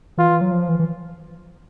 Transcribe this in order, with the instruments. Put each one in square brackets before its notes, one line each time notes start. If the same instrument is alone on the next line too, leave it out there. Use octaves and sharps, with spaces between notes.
[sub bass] E3 [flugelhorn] F4
[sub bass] F#3
F3
E3
E3